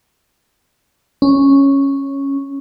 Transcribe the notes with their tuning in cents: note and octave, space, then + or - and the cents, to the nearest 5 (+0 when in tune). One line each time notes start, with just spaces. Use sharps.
C#4 -5